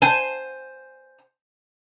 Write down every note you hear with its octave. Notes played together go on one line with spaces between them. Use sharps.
C5 G#5